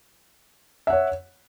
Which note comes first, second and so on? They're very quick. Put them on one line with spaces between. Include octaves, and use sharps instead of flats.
E5 F#5 C#5